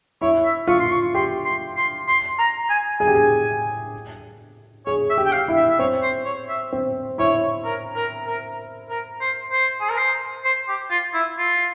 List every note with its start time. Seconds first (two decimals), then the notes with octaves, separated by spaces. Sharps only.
0.22 E4 C#5
0.45 E5
0.67 F4 C#6
0.80 C6
0.91 C#6
1.15 G4 C6
1.45 C6
1.77 C6
2.08 C6
2.39 A#5
2.69 G#5
3.00 G#4 G#5
3.07 G4
3.15 G#4
4.86 G#4 C#5
5.10 E5
5.18 G4
5.26 G5
5.32 F5
5.48 E4
5.56 E5
5.69 E5
5.79 C4 C#5
6.03 C5
6.25 C#5
6.49 E5
6.73 C4
7.18 E4 C#5
7.65 A#4
7.96 A#4
8.27 A#4
8.90 A#4
9.21 C5
9.51 C5
9.81 G#4
9.90 A#4
9.97 C5
10.44 C5
10.68 G4
10.90 F4
11.14 E4
11.38 F4